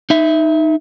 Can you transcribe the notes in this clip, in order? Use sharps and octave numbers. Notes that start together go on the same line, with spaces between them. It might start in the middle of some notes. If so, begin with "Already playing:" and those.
D#4 E5